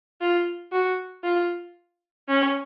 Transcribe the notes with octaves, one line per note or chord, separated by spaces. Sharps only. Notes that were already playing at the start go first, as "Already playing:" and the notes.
F4
F#4
F4
C#4